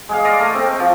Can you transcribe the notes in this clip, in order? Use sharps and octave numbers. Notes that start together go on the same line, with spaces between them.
G#3 G#4 F5
D5 D#5 F5
A3
C4
F3 F4